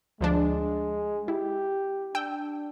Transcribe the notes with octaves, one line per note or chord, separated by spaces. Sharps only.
D2 F3 G#3 D4
E4 G4
D4 G5 E6